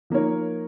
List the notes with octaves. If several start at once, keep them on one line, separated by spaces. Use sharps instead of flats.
F3 A#3 D#4 A#4 C#5